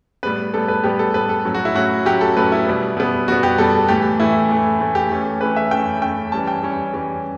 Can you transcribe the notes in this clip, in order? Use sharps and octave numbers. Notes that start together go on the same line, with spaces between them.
A2 G3 B3 B4
A2 G3 B3 A4
B4
A2 G3 B3 G4
A4
A2 G3 B3 B4
A4
A2 F#3 C#4
F#4
E4
A2 F#3 C#4 F#4
A2 F#3 C#4 G4
A4
A2 F#3 C#4 B4
E4
B2 G3 B3
B2 G3 B3
B2 G3 B3 F#4
G4
B2 G3 B3 A4
A2 E3 A3 G4
A2 E3 A3 E4
A2 E3 A3
A2 E3 A3
G4
E3 A3 C#4
E3 A3 C#4 B4
E5
E3 A3 C#4 G5
E3 A3 C#4 G5
E3 G3 C#4 A5
G5
E3 G3 C#4
E3 G3 C#4